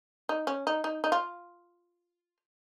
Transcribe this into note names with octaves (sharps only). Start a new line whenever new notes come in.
D#4
C#4
D#4
D#4
D#4
F4